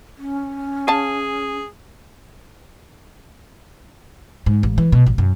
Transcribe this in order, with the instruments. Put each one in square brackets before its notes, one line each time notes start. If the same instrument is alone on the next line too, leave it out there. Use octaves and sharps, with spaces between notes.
[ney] C#4
[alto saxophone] G#4 [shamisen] F5 A5
[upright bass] G#2
A1
E3
B2
A1
F#2